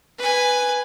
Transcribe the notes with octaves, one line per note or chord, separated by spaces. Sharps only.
B4 G#5